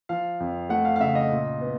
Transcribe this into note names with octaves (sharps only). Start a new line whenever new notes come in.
F3 F5
F2
A3 F#5
F5
F5
C#3 E5
D#5
A#2
B3